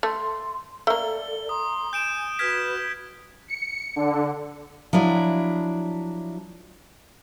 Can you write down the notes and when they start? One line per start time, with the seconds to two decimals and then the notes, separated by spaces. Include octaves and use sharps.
0.03 A3 C6
0.87 A3 A#3 A4 D5 G7
1.49 A#5 C6 D#6
1.93 G#5 G6 D7 E7
2.39 F#4 B4 F6 G#6 B6
3.48 C#7
3.96 D3
4.93 F3 F#3 D4 E4